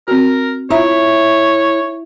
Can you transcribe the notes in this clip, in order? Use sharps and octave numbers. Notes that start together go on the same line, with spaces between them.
C4 F#4 A#4
E4 F4 C#5 E5 A#5